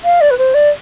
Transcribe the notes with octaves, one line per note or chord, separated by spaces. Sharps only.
F5
D5
B4
C5
D5